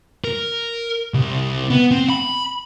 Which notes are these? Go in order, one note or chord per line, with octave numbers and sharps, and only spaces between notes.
A#4
C2
B3
C4
B5